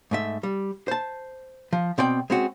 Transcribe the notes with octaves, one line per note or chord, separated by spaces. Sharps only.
G#2 A3 E5
G3
C5 A5
F3
B2 C4 D5 G5
G#3 C4 C#4 F#4